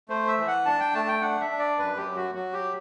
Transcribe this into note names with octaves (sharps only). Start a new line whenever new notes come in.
A3 C5
E5
E3
F#5
D4 A5
G5
A3 A5
G5
D4 F#5
E5
D4
D5
F#2 B4
G4
F#3
F#4
F#3 F#4
G4